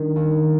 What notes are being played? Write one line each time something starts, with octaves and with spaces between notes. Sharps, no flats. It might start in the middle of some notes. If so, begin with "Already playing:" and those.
Already playing: D#3 D4
D#2
D#3